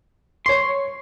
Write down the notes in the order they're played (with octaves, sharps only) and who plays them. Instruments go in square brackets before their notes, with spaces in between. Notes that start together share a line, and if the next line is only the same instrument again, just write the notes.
[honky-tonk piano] C#5 C#6 [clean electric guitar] C6